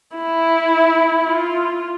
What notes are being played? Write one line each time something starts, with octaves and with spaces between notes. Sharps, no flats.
E4
F4